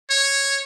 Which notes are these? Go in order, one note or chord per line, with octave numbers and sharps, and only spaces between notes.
C#5